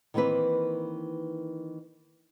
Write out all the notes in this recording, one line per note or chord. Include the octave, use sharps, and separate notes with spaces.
D#3 E3 A#3 C4 B4